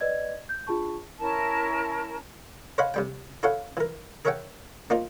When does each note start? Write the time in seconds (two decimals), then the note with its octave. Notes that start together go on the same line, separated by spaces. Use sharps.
0.01 B4 D5 D#5 G#6
0.49 G6
0.67 D4 F4 G#4 A5 C#6
1.19 C#4 E4 A#4 A5
2.78 C5 C#5 D#5 F5 F#5 B5
2.94 C3 G3 G5
3.43 E4 A4 C#5 F5 F#5
3.77 E3 A#4
4.25 G#4 A#4 C#5 E5 F#5 G5
4.90 A#3 D#4 F4 C5 D5